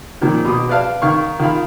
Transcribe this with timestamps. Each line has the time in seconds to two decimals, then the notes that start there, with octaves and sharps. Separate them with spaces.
0.21 A#2 D#3 F3
0.45 B2 D6 D#6
0.69 B4 D5 F5 A5
1.02 D#3 F5 C#6
1.39 D#3 F4 F5 B5